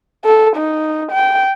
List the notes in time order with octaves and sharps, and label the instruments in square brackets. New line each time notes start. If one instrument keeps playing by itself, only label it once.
[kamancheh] A4
D#4
G5